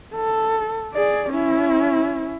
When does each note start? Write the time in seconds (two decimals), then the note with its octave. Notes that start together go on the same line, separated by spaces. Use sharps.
0.15 A4
0.94 G#4 D5
1.30 C#4 E4